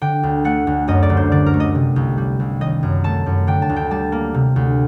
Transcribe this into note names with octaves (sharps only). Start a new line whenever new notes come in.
D3 G5
D2
A3 F#5
D2
F#2 D#5
D5
G1
C5
D3 D5
A#4
A3
D#5
C3
C2
G3
C2
D#3 D#5
F#2
A3 A5
F#2
D3 G5
A5
D2
G5
G3 A5
A#3
C3
D2